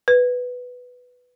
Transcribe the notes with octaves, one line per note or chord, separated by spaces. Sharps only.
B4